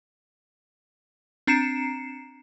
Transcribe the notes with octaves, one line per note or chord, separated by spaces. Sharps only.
C4 D4 A#5 C7 C#7 E7